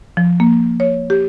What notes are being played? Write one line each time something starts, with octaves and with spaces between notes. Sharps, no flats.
F3
A#3
C#5
G4